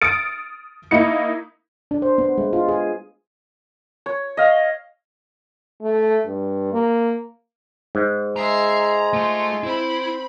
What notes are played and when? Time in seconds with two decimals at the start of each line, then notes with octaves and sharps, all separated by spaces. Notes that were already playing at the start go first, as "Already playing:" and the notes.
0.02 D#6 F6 A6 C#7 D7
0.91 A#3 D#4 E4 C#7
1.91 D4
2.02 C5
2.18 B3
2.38 G#3
2.53 F4
2.68 G#4
4.06 C#5
4.37 D#5 F5
5.82 A3
6.26 G2
6.73 A#3
7.95 G#2
8.36 G#3 E5 A#5 C7
9.13 A3 F4
9.63 C4 E4 B5